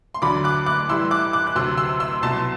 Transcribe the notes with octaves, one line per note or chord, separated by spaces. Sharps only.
C6
D2 D3 F#3 B5 D6
D6 F#6
D6 F#6
A2 E3 G3 C6 E6
D6 F#6
D6 F#6
F#6
D2 C3 F#3 C6 E6
C6 E6
C6 E6
C2 B2 F#3 A5 C6